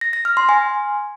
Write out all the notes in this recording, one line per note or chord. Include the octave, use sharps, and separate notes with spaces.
A#6
A#6
F6
C6
G#5